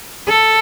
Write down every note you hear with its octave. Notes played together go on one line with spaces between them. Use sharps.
A4